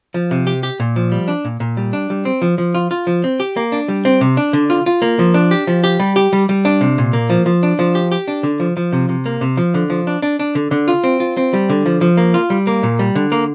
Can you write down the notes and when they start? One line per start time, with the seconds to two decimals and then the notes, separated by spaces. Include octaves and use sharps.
0.14 F3
0.31 C3
0.47 G4
0.63 G4
0.80 A#2
0.96 F3
1.12 G3
1.28 D4
1.45 A#2
1.60 A#2
1.77 G3
1.93 D4
2.10 G3
2.25 C4
2.42 F3
2.58 F3
2.75 F4
2.91 F4
3.07 F3
3.24 C4
3.40 G4
3.57 A#3
3.72 D4
3.88 G3
4.05 C4
4.21 C3
4.37 D4
4.53 D3
4.70 F4
4.86 F4
5.02 A#3
5.19 F3
5.34 D4
5.51 G4
5.67 F3
5.84 G4
6.00 G3
6.16 G4
6.33 G3
6.49 G3
6.65 D4
6.81 C3
6.98 A#2
7.13 A#3
7.30 F3
7.46 F3
7.63 D4
7.79 F3
7.95 G4
8.12 G4
8.28 D4
8.43 D3
8.60 F3
8.77 F3
8.93 C3
9.09 C3
9.26 A#3
9.41 C3
9.57 F3
9.74 D3
9.90 F3
10.07 D4
10.22 D4
10.39 D4
10.55 D3
10.71 D3
10.88 F4
11.04 C4
11.20 F4
11.37 C4
11.54 G3
11.69 D3
11.86 F3
12.01 F3
12.17 A#3
12.34 F4
12.50 G3
12.67 A#3
12.83 A#2
12.99 G3
13.15 D3
13.32 A#3